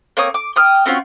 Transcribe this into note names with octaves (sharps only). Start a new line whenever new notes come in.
A#3 C4 C#5 D#6
D6
G5 D#6 F6
C4 C#4 F4 F#4